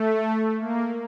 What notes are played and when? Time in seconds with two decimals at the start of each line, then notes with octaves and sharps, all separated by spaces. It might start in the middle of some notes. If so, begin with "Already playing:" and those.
Already playing: A3
0.59 A#3